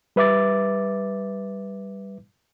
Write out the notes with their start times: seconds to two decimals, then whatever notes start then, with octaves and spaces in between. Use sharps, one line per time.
0.16 G3 B4 E5 D6 A6